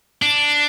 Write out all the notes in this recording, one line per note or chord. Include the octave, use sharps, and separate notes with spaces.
D4